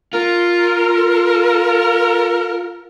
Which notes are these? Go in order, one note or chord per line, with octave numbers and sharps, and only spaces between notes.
F4 A#4